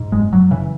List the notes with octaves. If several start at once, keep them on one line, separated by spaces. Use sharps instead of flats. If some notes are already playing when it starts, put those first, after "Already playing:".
Already playing: G#2
F#1 G#3
F#1 F#3
C#3 E3